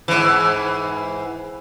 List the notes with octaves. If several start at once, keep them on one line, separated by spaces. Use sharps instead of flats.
G#2 E3